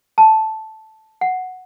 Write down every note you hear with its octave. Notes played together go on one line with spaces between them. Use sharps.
A5
F#5